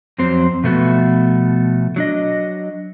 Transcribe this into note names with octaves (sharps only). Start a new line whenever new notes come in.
F2 F#3 C4 C5
B2 F3 A3 B3 F#4
F#3 D4 D#5